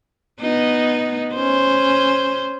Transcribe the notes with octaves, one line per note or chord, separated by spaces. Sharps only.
B3 D#4
C#4 C5